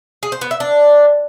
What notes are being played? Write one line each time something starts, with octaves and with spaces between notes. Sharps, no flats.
G#4
C5
B3
E5
D4